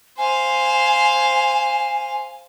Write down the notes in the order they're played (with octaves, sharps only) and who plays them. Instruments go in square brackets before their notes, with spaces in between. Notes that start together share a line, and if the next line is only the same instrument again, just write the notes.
[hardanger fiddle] C5 F5 [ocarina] G#5